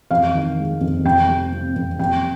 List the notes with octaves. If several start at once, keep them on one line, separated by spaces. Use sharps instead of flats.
F2 F5
D#3
G#3
F2
F2 G5
C3
C3
F2
F2 G5